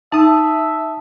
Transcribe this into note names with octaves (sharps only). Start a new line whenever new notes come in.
D#4 E5 A5 D#6